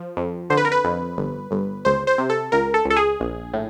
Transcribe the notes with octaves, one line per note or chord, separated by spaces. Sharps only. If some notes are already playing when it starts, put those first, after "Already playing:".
Already playing: F3
F2
D3 C5
B4
A#4
B4
F2
G1
G1
C#2 C5
C5
C3
A4
C#2 A#4
A4
C#2
A4
G#4
A#1
A2